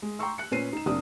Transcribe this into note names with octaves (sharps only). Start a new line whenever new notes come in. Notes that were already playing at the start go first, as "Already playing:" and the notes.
G#3
G5 A#5 C6 C#6 E6
F#6 C#7
A#2 C#4 B4 C5 C7 D#7
D#4 E7
F#1 C4 D4 D5 D#6